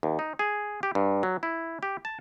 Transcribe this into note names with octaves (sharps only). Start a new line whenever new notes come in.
D#2
D#4
G#4
G4
G2
F#3
E4
G4
A5